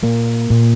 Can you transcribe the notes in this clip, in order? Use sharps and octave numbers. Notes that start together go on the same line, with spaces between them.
A#2 A#3
A#2